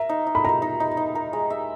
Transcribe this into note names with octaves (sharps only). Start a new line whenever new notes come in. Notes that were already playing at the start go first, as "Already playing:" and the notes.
Already playing: A#4 E5
D#4
D#4
B5
D#4 A#5
D#4
D#4
D#4
A#4
G#3
E5